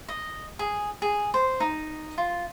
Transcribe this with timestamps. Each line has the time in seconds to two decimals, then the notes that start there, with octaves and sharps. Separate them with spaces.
0.09 D#5
0.59 G#4
1.02 G#4
1.34 C5
1.60 D#4
2.18 F4